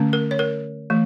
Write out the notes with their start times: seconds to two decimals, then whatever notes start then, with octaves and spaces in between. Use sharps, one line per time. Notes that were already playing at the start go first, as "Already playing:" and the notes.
Already playing: D3 A3 C#4
0.13 A#4
0.31 C#5
0.39 A#4
0.90 E3 A3